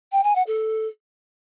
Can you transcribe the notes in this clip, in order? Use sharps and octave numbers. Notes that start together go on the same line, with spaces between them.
G5
G#5
F#5
A4